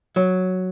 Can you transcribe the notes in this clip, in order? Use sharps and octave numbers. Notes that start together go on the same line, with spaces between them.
F#3